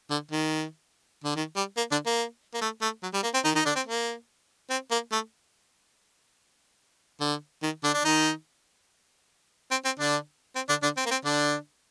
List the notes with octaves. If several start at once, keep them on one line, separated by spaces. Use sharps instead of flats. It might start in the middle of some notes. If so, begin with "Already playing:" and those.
D3
D#3
D3
D#3
G3
A#3
D3 D4
A#3
A#3
A3
A3
F#3
G3
A#3
C4
D#3 D#4
D#3 D#4
D3 D4
C4
A#3
C4
A#3
A3
D3
D#3
D3 D4
D4
D#3 D#4
C4
C4
D3 D4
C4
D3 D4
D3 D4
C4
A#3
C4
D3 D4